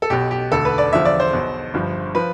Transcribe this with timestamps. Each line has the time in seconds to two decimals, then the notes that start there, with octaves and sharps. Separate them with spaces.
0.02 A4
0.10 B1 B2 G4
0.31 G4
0.52 E1 D2 D3 A4
0.65 B4
0.78 D5
0.92 E2 D3 F3 E5
1.05 D5
1.20 C5
1.33 B1 B2
1.74 G1 G2 F3
2.15 F3 B4